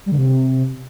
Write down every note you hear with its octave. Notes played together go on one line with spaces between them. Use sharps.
G3
D3
C3